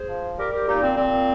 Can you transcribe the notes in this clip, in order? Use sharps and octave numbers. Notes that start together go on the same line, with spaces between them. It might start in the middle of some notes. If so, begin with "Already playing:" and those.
Already playing: G#4 C5
F3
G3 G4 A#4
G4 A#4
A#2 D#4 G4
C4
A#2 C4